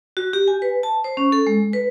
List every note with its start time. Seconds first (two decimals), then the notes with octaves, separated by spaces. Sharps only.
0.17 F#4
0.33 G4
0.48 G#5
0.62 B4
0.83 A5
1.04 C5
1.17 C#4
1.32 A4
1.47 G#3
1.73 B4